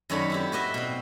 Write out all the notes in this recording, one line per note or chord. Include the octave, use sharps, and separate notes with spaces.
F#2 D#3 A4 C#5 D5 B5
C4 E4 G4
F#4 B4 D#5 E5
B2 C4